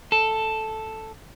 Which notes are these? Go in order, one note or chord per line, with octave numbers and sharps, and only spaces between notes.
A4